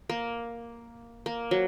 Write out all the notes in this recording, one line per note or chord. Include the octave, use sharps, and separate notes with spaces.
A#3
A#3
F#3